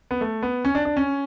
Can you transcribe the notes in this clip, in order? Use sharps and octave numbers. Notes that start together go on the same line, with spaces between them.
B3
A3
B3
C#4
D4
D4
C#4